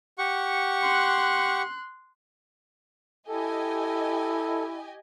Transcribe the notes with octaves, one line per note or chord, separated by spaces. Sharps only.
G4 F#5 C#6
C6 F#6
E4 G4 A4 D#5 G#5